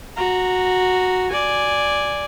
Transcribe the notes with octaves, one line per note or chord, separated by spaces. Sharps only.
F#4 A#5
D5 G#5